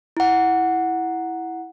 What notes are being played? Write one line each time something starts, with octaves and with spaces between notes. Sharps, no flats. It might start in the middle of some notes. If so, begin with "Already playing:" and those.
E4 F#5